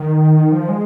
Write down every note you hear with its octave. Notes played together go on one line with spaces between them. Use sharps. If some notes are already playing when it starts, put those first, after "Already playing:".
Already playing: D#3
F3
G#3